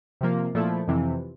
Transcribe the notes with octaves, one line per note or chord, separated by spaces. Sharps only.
C3 F3 A#3
A#2 F3 A3 E4
F2 C3 E3